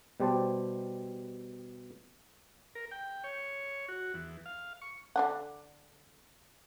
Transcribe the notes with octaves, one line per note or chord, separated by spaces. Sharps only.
B2 G3 G4 C5 A5
A#4
G5
C#5
F#4
E2
F5
C#6
D3 D4 F#5